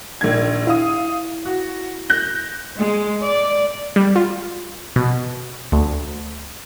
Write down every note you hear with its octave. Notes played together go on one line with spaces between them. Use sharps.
A#1 D#3 G#6
E4 F5 D#6
F#4
F#6 G6 A#6
G#3
D5
G3
F4
B2
D2